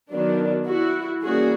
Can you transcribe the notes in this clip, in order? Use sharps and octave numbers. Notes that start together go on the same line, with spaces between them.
D#3 F#3 B3 D4
E4 F#4
E3 G3 A#3 C#4 F#4 G#4